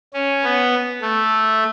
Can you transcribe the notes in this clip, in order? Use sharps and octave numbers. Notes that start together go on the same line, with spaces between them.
C#4
B3
A3